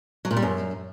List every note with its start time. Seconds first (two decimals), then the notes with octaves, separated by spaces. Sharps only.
0.25 F#3
0.31 A#2
0.37 G3
0.42 F#2